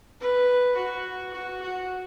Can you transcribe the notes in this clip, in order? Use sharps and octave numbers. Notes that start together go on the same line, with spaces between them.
B4
F#4
F#4
F#4